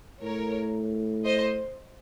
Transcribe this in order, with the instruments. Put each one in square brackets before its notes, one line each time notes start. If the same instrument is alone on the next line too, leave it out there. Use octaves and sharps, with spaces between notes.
[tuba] A2 [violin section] A#4 C#5
[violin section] C5 D#5